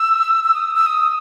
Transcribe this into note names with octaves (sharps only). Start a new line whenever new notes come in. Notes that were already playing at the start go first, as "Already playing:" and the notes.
Already playing: E6
E6
D#6
E6
E6
D#6